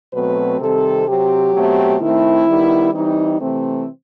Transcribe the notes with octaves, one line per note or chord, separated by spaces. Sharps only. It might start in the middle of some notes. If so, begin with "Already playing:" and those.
B2 F#3 A3 C4 B4
C3 D#3 G3 C4 A4
C3 F#3 C4 G4
B2 F#3 A3 C4
D#3 A3 C4 E4
D#3 G3 B3
E3 G3 C4 D#4
C3 E3 A3 C4